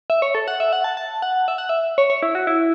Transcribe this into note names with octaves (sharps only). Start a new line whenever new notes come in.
E5
C#5
A4
F#5
E5
F#5
A5
A5
F#5
E5
F#5
E5
C#5
C#5
E4
F#4
E4